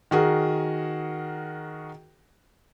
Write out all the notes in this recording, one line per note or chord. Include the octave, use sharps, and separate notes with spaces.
D#3 F#4 G#4 A#4